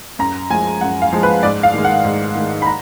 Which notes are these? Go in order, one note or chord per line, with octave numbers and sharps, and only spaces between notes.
F#2 A#5
F3 G#3 G#5
F#2 F#5
F5
F3 G#3
B4
G#2 D5
F5
D#3 G#3
F#5
G#2
D#3 G#3
B5
A#5